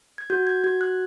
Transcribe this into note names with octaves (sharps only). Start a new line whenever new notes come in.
G#6
F#4 G6
G#6
F#4 G#6
F#6